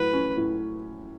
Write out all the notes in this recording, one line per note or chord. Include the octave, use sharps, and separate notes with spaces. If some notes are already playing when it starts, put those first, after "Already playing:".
Already playing: A2 F#3 B4
C#4
A2